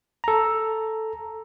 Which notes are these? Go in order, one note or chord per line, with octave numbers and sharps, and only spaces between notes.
A4 A#5